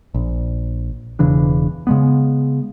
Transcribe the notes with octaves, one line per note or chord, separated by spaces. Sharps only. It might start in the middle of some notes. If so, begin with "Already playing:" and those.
A#1
E1 C#3 E3 D4
C#3 G#3 B3